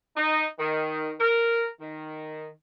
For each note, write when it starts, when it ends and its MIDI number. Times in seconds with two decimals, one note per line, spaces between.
0.16 0.45 63
0.59 1.14 51
1.20 1.65 70
1.80 2.48 51